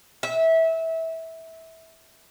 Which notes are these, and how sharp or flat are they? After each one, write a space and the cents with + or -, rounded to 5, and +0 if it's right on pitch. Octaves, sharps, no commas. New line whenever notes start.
E5 -20